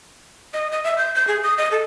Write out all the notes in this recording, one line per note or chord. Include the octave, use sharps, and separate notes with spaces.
D#5
D#5
E5
G6
G6
G#4
D#6
D#5
A4